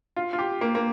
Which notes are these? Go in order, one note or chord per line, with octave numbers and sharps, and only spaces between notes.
F4
F4
G4
A#3
A#3